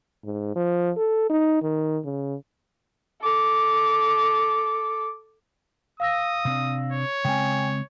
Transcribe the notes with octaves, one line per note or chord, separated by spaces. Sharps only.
G#2
F3
A4
D#4
D#3
C#3
A4 D6
F5 D#6 E6 A#6
C3 C4 D4
C#5
C#3 G#3 C4 G5 G#5